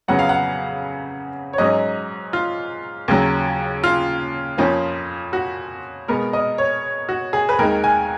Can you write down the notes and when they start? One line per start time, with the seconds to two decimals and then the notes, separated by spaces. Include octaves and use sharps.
0.08 F2 C#3 F#3 B3 F#5
0.19 F5
0.29 F#5
1.53 C#5
1.58 G#2 F#3 C#4 D#5
2.33 F4
3.08 D#2 C#3 F#3
3.84 F4
4.58 F2 F3 A#3 C#4
5.33 F#4
6.08 B2 G#3 B3 A#4
6.33 D#5
6.58 C#5
7.09 F#4
7.33 G#4
7.49 B4
7.58 D#2 D#3 G#3 A#4
7.84 G#5